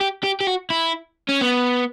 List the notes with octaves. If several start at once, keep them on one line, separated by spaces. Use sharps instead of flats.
G4
G4
G4
F#4
E4
C#4
B3